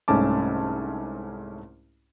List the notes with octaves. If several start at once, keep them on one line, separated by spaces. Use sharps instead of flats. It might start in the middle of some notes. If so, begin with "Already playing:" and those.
C2 G#2 A3 C#4 A5 D6